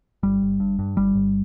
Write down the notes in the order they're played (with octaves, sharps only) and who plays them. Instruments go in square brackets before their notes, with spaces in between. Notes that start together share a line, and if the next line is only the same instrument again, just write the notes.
[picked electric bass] G1 G3
G1
G2
G2
G1 G3
G1